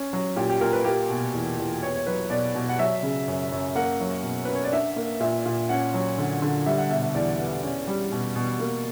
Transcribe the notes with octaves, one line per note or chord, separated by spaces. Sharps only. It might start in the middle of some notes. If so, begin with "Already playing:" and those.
Already playing: C#4
F#3
A#2 G4
G4
A#2 A#4
B4
A#3 G4
B2
E2
E2
B3 C#5
C#5
F#3 B4
B2 D5
B2
F#5
F#3 E5
C#3
F#2
F#2
A#3 F#5
F#3
B2
C#4 B4
C#5
D5
D4 E5
A#3
A#2 E5
A#2
C#4 F#5
F#3
D3
D3
G3 E5
F#5
B2 E5
E5
E2 D5
B3
C#4
G3
B2
B2
A#3